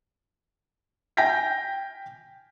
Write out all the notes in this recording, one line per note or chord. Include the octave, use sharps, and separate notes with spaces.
G5 G#5 G6 A#6 B6